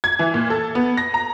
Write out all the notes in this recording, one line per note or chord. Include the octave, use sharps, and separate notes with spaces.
G#6
E3
A#2
A4
B3
A#6
A#5